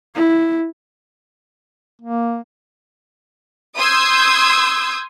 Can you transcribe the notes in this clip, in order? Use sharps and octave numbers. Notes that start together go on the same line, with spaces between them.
E4
A#3
C6 D#6 E6 G6 G#6